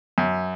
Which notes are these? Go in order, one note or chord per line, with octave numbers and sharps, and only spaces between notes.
F#2